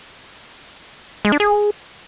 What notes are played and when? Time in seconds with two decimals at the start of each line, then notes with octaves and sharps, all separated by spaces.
1.25 G#3
1.32 D4
1.40 G#4